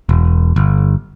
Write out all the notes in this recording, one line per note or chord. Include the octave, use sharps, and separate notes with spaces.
E1
G1